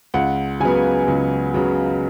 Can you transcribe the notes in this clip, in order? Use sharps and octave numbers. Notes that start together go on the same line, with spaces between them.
C#2 F#5
C#3 F#3 B3 G#5
C#2
C#3 F#3 B3